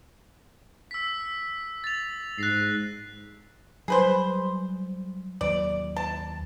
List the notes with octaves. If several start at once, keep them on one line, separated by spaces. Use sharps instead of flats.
E6 B6
A6 F7
G#2 F#6 A#6 C7
F#3 G3 G#4 B4 C5
D#2 F#3 A#3 D5
A5